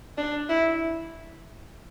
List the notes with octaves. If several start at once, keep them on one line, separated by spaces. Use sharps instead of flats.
D4
E4